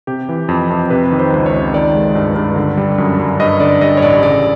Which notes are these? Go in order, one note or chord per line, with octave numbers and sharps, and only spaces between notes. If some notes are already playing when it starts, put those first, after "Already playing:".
C3 G4
E3
F2
F2
C3 B4
D#3
C5
C#2
C#5
C#2
D#3 D5
G#3
G2
G2
D3
G3
F#2
F#2
G2 D#5
D3 D5
G3 D#5
C#5
A1 D5
C#3 D5